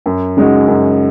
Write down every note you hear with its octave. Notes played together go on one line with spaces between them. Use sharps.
F#2
C#3 G#3 D#4 F#4
F#2